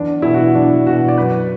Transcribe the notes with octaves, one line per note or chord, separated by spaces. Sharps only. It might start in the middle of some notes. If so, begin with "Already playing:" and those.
Already playing: E2 D4
B2 E4
F#4
E2 D4
B2 F#4
D5
F#2 B4